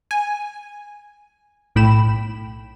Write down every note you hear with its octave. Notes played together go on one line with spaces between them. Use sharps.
G#5
B1 A2 G5 B5 E7